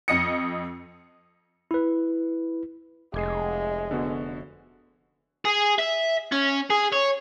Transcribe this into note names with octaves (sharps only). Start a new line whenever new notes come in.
F2 D#5 D#6 C#7
E4 B4
F1 G#3 D6 G#6 C7
D3 B3 F#4
G#4
E5
C#4
G#4
C#5